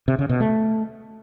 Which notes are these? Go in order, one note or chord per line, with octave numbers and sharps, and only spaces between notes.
C3
C#3
B2
A3